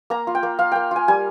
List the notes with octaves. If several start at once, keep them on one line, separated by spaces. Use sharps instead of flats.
A#3 A#5
F4
G5
A#3
F4 F5
A#3 G5
F4 G#5
G3 G#5